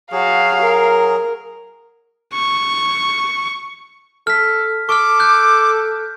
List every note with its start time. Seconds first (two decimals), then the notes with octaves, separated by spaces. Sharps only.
0.12 F#3 F#4 G#4 F5
0.61 A#4
2.34 C#6
4.27 A4 F6 B6
4.89 A4 C#6 D6 F6
5.20 F#6 G6